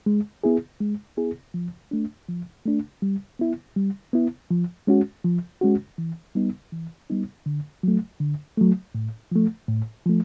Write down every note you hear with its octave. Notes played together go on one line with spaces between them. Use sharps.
G#3
B3 E4 G#4
G#3
B3 E4 G#4
F3
A3 D4
F3
A3 D4
G3
B3 E4
G3
B3 E4
F3
G#3 C#4 F#4
F3
G#3 C#4 F#4
E3
G3 B3 D#4
E3
G3 B3 D#4
D3
F#3 A3
D3
F#3 A3
A2
F3 A3
A2
F3 A3